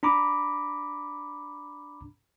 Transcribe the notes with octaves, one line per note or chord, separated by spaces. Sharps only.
D4 A#5 B5 D6